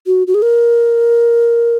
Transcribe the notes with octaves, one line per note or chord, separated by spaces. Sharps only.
F#4
F#4
G#4
A#4